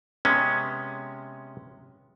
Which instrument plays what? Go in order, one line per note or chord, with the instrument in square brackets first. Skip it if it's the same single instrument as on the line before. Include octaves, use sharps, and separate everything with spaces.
[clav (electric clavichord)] C3 G#3 B3 C#4